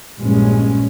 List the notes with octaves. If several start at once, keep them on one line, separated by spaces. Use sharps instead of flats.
A#1 G2 G#3 C#4